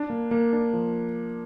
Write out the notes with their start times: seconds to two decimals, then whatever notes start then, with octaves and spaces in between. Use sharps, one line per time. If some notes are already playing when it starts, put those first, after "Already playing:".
Already playing: D4
0.10 A#3
0.31 A#3
0.53 D4
0.73 F3